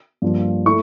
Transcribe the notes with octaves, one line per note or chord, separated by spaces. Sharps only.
G2 F3 A#3
A3 E4 C#6